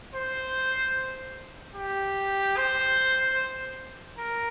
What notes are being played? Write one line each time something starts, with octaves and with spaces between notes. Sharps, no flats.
C5
G4
C5
A#4